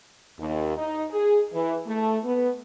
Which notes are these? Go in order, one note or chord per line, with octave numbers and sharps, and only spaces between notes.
D#2
D#4
G#4
E3
A3
B3